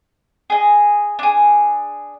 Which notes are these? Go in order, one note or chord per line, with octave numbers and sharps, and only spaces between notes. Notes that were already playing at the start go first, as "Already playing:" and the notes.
G#4 D#5
D4 G#4